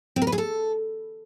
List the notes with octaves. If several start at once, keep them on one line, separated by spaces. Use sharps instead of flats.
C4
A#4
B4
G#4
A4